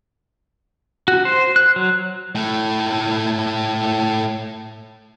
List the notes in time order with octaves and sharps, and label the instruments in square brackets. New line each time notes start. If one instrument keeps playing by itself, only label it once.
[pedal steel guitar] F#4
C5
F#6
F#3
[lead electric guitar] A2 A3